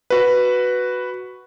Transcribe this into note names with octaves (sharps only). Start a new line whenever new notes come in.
F#4 B4